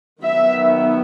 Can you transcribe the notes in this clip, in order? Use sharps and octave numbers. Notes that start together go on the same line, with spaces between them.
D#3 F#3 B3 E5